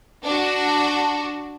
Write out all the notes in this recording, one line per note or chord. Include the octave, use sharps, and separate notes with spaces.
D4 F#4